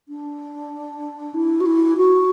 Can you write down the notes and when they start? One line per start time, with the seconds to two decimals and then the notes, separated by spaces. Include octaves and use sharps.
0.08 D4
1.34 E4
1.60 F#4
1.66 E4
1.97 F#4